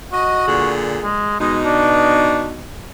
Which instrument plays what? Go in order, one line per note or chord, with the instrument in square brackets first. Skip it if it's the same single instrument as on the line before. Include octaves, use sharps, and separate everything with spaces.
[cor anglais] F#4 [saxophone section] D#5
[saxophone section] A#2 D3 G#4
[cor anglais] G#3
[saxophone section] B2 D#4 [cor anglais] G#3
[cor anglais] D4